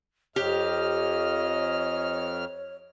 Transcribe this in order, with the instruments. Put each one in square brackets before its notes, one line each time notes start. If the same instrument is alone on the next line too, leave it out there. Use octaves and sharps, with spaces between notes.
[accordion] F2 F6 [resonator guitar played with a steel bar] G4 [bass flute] C#5 [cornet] D#5